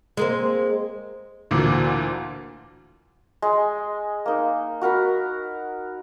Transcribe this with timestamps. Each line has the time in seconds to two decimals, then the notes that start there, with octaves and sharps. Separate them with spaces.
0.17 G#3 A#3 C4
1.51 D2 A#2 D3 E3
3.42 G#3
4.26 A#3 D#4
4.81 F#4 A#4 F#5 B5